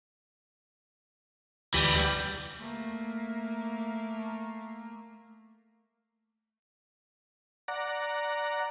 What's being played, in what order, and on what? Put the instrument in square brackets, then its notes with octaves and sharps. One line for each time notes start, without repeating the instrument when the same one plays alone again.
[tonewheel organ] D2 G4 B5 [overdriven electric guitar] E3 G3
[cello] A3 A#3
[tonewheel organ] D5 F#5 A#5